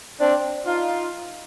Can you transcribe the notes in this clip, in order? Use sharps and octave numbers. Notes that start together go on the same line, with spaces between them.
C4 D4
D#4 F4